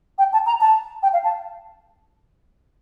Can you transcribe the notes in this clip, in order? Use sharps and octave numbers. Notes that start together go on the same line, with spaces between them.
G5
A5
A#5
A5
G5
F5
A5